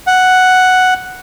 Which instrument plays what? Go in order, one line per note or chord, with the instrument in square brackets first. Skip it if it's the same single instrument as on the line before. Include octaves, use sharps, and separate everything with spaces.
[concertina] F#5